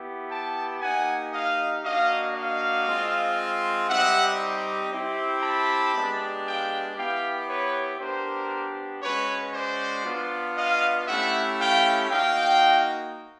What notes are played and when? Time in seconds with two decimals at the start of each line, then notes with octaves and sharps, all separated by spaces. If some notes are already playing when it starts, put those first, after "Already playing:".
Already playing: B3 E4 G4
0.30 G5 A5
0.81 A#3 D#4 G4 F#5 G#5
1.33 D#5 F5
1.84 A#3 D4 F#4 D#5 F5
2.35 D#5 F5
2.87 G#3 C4 F4
3.89 G3 C4 D#4 G4 E5 F#5
4.92 C4 E4 G4
5.43 A5 B5
5.94 G#3 B3 D4 G4
6.46 F5 G5
6.96 B3 E4 G4 F5 G5
7.48 B4 C#5
8.00 B3 D4 G4 A#4 C5
9.02 G#3 C#4 F#4 B4 C#5
9.54 C5 D5
10.04 B3 D4 F4
10.56 D#5 F5
11.07 A3 C#4 E4 G4 E5 F#5
11.59 F5 G5
12.10 A#3 D#4 F#4 F5 G5